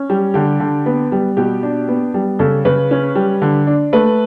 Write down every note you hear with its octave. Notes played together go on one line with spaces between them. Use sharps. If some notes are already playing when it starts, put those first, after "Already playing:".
Already playing: C#4
G3
D3 G4
D3
B3
G3
B2 G4
D4
B3
G3
C#3 A4
C#3 B4
C#4
G3
D3
D4
A3 B4